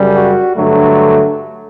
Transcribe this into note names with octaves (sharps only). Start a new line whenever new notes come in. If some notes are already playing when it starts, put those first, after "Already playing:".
Already playing: F#2 C#3 G3
F#4
G2 D3 F#3 A3